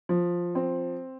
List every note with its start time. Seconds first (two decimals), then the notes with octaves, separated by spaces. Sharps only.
0.09 F3
0.55 C4